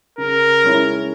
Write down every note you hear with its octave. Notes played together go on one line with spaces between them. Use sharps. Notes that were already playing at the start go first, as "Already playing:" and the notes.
C#3 A#4
G#3 C#4 E4